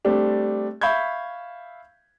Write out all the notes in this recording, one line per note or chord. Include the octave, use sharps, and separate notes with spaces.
G3 A3 C4 D4 G4
E5 F5 B5 C#6 G6 G#6